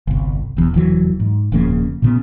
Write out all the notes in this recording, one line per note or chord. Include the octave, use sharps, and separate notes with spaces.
G1 C2
E1 E2
F1 E2 E3 F#3
G#2
D#1 F2 C#3 A#3
A#2 C#3 B3